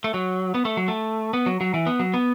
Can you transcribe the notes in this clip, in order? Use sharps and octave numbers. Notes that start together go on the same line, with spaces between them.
A3
F#3
B3
A3
F#3
A3
B3
F#3
F#3
E3
B3
F#3
B3